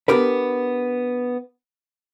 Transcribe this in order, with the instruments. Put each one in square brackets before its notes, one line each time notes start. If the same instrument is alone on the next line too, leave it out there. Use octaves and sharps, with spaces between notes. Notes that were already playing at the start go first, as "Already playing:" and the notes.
[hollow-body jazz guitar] B3 D4 G4 A#4 B4